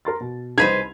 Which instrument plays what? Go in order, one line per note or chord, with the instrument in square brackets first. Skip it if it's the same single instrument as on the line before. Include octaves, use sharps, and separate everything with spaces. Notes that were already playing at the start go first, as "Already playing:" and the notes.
[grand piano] A#4 C6 A6
B2
[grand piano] C2 D#5 F7 [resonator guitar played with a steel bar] G#4 B4 C5 [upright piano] G#6